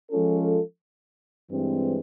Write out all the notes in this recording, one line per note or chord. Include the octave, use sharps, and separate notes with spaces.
F3 G#3 C#4 F4 A4
G2 E3 G#3 C4